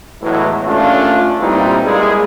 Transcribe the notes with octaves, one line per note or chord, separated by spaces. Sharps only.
E2 A2 E3 F#3 G#3 E4
D#2 A3 C#4 D4 F4
G2 A#2 G3 C4 D#4 E4
G3 G#3 A#3 E4 G#4